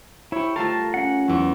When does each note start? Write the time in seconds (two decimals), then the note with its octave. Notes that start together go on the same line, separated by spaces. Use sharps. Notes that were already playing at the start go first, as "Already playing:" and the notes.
0.32 E4 G4 C#5
0.56 A3 F4 A#4 A5
0.94 C#4 F#5
1.28 E2 F#3